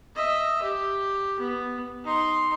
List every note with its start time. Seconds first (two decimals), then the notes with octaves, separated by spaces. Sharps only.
0.15 D#5 E5
0.62 G4
1.40 B3
2.04 D#4 C6